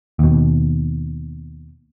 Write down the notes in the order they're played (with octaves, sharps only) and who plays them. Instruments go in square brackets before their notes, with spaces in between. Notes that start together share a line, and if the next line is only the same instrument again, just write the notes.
[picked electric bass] D#2 B2